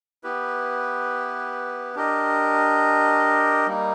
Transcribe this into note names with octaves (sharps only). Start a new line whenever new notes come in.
B3 E4 G4 B4
D4 G4 A#4 D#5
G3 A#3 D#4